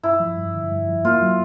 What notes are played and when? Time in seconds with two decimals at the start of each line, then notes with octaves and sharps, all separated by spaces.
0.03 G2 E4
0.20 F3
0.37 G2
0.54 D3
0.71 G2
0.88 F3
1.05 A#3 F4
1.22 F#3